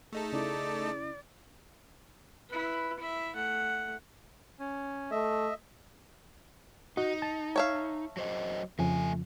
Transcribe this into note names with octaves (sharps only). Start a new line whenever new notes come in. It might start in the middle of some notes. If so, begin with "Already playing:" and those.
A3 D#4 G#4 A4
C#3 E4 D5
E4 B4
E4 E5
A3 F#5
C#4
A3 D#5 E5
D#4 F#4 D#5
A5
C#5 E5 F5
F#3 C5 D#5
F2 C#3 F3 A3 G#5